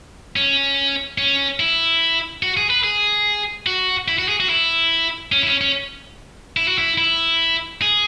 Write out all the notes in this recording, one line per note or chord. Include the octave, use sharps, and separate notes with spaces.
C#4
C#4
E4
F#4
G#4
B4
G#4
F#4
E4
F#4
G#4
F#4
E4
C#4
E4
C#4
C#4
E4
F#4
E4
E4
G#4